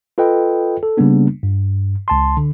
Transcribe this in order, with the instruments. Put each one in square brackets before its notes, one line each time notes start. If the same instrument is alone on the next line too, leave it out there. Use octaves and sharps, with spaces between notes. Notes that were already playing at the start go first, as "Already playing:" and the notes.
[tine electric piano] F4 A4 B4 D#5 G5
A4
C#3 G3 A#3 B3 D4
G2
C#2 A5 C6
D3